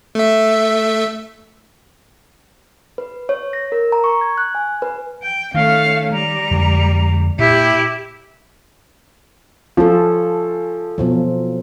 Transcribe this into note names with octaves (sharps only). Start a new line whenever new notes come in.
A3 E5
B4
C#5
A#6
A#4
A#5
C#6
G#6
F#6
G#5
B4
G5
D#3 A3 C#4 F5
G3 A#5
F2 D3 G#3
A#2 E4 G4
F3 C#4 F4 A4
B2 F3 F#3